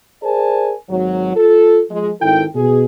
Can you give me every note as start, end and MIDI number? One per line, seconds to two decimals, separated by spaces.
0.23 0.73 68
0.23 0.73 70
0.23 0.73 72
0.23 0.73 74
0.23 0.73 80
0.23 0.73 81
0.89 1.34 32
0.89 1.34 54
1.35 1.81 65
1.35 1.81 69
1.90 2.11 53
1.90 2.11 56
2.20 2.44 32
2.20 2.44 51
2.20 2.44 64
2.20 2.44 69
2.20 2.44 79
2.54 2.84 47
2.54 2.84 68